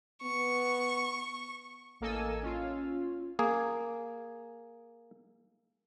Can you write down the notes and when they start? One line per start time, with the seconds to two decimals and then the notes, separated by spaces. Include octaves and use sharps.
0.22 B3 C#6
2.01 A1 A#3 A4 D#5 G#5 E6
2.43 C#4 F4
3.39 A#3 G#4